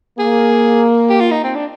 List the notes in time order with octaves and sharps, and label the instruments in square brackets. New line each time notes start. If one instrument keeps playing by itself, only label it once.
[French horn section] A#3 [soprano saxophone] G#4
[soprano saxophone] G4
F4
D#4
C4
D4